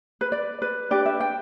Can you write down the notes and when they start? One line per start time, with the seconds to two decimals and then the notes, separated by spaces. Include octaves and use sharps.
0.21 B4
0.32 D5
0.62 B4
0.91 D4 G4 B4 D5
1.06 E5
1.20 G5